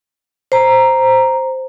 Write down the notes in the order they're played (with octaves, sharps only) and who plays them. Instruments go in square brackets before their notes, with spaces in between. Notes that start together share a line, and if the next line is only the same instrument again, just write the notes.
[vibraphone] C5 A#5